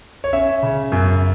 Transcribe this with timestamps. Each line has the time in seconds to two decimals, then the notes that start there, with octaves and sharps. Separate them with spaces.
0.24 C#5
0.33 C#4 E5
0.63 C#3
0.92 F#2